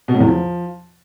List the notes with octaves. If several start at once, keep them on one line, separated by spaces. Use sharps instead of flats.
B2
A2
E2
F3